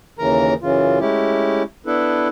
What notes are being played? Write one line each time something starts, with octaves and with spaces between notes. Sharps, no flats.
D#2 C#3 E3 A#4 A#5
F#2 C#3 E3 F4
G#3 A3 C#4 E4 G4
B3 D4 E4 A4 B4